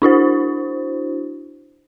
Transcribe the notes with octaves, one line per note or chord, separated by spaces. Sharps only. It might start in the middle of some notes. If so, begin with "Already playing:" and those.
D4 E4 F#4 C5